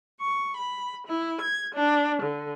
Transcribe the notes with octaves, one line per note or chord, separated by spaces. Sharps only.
C#6
B5
E4
G#6
D4
D3